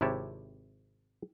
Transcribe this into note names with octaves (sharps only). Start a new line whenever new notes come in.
G#1 C3 E4 G4 C#5 A5